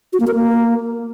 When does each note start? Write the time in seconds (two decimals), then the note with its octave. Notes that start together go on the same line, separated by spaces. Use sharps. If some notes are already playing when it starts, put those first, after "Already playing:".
0.13 F#4
0.20 A#3
0.27 A#4
0.35 A#3